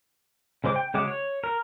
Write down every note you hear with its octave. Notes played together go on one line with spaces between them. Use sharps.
C#3 G#3 C5 D6
G5
C#3 G#3 F#4 D6
C#5
A#4